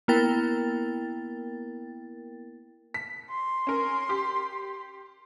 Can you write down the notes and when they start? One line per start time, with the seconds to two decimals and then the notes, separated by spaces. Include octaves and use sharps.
0.08 A#3 B3 E4 A#4 G5 A6
2.94 B6
3.31 C6
3.67 C#4 A#4
4.09 G4